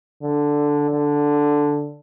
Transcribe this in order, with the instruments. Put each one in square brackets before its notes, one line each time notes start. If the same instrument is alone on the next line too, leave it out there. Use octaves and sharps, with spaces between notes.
[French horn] D3
D3